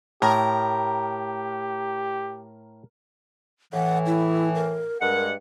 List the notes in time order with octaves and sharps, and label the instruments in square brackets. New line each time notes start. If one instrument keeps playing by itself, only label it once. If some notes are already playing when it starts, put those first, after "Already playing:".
[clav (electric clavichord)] A2 [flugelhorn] G4 [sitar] A#4
[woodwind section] A2 E3 [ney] F#5
[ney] E4
A#4
[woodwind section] G2 G#3 F#5 [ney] A#4